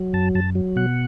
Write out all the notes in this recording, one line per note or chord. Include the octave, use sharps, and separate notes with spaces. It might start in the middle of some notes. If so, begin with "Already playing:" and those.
Already playing: F#3
F#2 A5
F#2 A5
F#3
B2 F#5